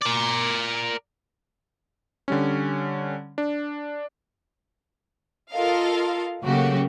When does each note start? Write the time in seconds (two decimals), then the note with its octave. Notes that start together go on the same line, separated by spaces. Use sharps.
0.02 A#4 D5
2.28 D3 G3 C#4
3.38 D4
5.52 F4 A4 A#4 D#5 F5
6.43 C#3 F#3 A3 A#3 F#4 G4